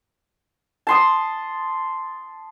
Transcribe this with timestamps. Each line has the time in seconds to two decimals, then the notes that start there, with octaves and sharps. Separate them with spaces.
0.87 A5 C6 D#6